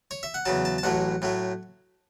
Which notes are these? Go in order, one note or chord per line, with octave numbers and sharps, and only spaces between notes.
C#5
E5
F#5
E2 C#3 F#3 A5
A5
A5
A1 A2 F#3 A3 F#5
A2 F#3 A3